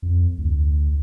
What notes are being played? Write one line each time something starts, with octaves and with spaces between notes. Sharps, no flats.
F2
D2